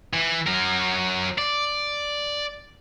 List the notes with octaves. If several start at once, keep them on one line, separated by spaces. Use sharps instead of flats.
E3
F#3 A#4
D5